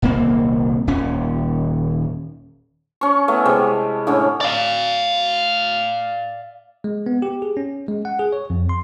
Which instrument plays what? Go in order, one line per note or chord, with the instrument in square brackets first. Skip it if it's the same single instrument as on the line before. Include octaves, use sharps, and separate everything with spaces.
[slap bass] D#1 C2 A#3 C4
D#1 D#2 C#4
[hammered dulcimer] C#4 C#6
A3 B3 E4
C3 G3 G#3
A2 D3 C#4
[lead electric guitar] D5 F5
[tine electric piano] G#3
B3
G4
G#4
C#4
G#3
F#5
G#4
C#5
F2
C6